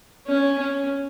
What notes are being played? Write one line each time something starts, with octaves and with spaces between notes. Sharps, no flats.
C#4
C#4